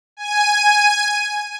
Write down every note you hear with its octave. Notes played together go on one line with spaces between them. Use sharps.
G#5 D#7